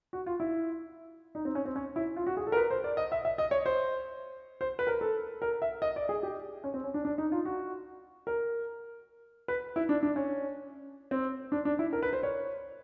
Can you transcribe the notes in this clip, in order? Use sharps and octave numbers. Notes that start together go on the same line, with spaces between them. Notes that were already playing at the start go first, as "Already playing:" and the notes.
F#4
F4
E4
D#4
C4
C#4
C4
C#4
E4
F4
F#4
G#4
A4
A#4
B4
C5
D5
D#5
E5
E5
D#5
C#5
C5
C5
B4
A#4
A4
A#4
E5
D#5
D5
G#4
G4
C#4
C4
C#4
D4
D4
D#4
F4
F#4
A#4
B4
E4
D4
D4
C#4
C4
D4
D4
E4
A#4
B4
C5
C#5